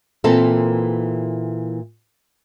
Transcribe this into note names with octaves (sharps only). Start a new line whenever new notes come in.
A#2 E3 A#3 C4 A4